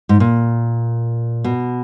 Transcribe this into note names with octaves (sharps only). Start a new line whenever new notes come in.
G#2
A#2
B2